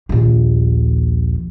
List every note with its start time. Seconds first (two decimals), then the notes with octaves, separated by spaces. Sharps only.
0.09 A#1 D#2